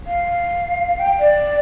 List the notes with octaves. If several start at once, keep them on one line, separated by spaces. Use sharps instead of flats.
F5
G5
D5